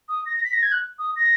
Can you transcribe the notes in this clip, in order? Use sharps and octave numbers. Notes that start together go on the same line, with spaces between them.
D#6
A#6
A#6
B6
A#6
G#6
F#6
D#6
A#6